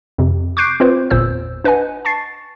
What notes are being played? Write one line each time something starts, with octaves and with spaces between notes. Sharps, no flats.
F2 C3
C#6 D6 F#6 G6 C7 D7
C4 F4 B4 C5
G1 E2 A#2 C5 E6
D4 B4 D#5 F#5 G#5
A5 C#6 A6 C7